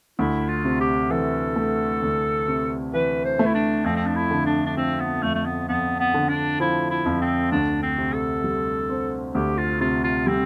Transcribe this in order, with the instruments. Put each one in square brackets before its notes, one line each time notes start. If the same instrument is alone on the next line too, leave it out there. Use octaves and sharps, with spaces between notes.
[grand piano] D2 [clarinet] E4
[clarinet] F4
[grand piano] C3
[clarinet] G4
[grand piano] E3 [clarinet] A4
[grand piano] A3
D2
C3
[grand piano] E3 [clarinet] B4
[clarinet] C5
[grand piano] A3
[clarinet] E4
D4
[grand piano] F2 [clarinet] C4
[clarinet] C4
D4
E4
[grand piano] D3
[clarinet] D4
D4
[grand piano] F3 [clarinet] C4
[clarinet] B3
[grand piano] F2 [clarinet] A3
[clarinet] A3
B3
[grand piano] F2 [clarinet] B3
[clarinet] B3
[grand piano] D3
[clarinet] D4
[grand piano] F3 [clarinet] E4
[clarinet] E4
[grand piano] F2
[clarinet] C4
[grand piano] D2 [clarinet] D4
[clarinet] C4
[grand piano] C3
[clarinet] A4
[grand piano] G3
C4
[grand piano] D2 [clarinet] G4
[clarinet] F4
[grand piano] C3 [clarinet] F4
[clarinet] F4
[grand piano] G3 [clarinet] C4